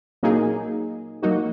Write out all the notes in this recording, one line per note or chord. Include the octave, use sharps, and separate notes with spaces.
A#2 F#3 A#3 D#4 G#4
F#3 A#3 D#4 F#4